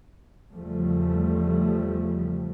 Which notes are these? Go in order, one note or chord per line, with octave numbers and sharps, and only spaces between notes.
E2 C#3 F3 G3 A3